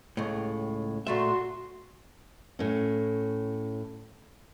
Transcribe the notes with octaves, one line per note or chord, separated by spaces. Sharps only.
C#2 A2
A#2 A3 F#4 E5 C6
A2 C#4